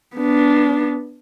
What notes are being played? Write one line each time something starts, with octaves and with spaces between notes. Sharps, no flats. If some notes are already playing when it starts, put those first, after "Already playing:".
B3 D4